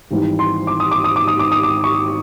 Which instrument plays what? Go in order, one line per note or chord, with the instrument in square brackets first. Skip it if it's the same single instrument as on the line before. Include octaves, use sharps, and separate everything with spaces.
[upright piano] G#1 G#2 E3 G3
C6
D6
D#6
D6
D#6
D6
D#6
D6
D#6
D6
C#6